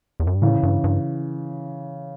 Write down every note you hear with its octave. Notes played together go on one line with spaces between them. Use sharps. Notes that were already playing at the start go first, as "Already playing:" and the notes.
E2
F#2
G2
A2 C#3 E3
G2
G2